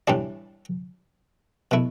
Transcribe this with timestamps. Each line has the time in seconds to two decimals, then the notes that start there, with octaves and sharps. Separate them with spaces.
0.08 A2 E3 G3 D4
1.71 B2 A3 E4